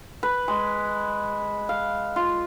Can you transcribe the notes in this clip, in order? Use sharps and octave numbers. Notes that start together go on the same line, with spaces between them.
B4
G#3
F5
F4